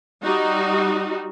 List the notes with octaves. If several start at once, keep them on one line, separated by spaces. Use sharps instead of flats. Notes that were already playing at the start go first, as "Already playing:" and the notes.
G3 D#4 F#4